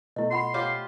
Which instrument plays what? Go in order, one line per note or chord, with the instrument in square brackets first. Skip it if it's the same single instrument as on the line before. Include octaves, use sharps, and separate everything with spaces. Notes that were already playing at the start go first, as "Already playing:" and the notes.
[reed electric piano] B2 A3 [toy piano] E4 D#5
[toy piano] F4 F#5 B5 [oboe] C6
[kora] F4 G4 C5 [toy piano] C#5